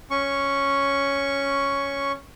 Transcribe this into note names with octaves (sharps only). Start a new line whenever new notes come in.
C#4 C#6